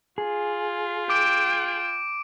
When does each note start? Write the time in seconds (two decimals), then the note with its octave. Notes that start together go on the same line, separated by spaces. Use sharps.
0.18 F4 G#4
1.10 G5 D6 D7